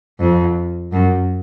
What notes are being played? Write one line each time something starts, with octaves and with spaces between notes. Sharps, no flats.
F2
F#2